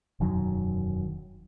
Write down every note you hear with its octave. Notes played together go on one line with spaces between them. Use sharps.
E1 F#2 D#3 F#3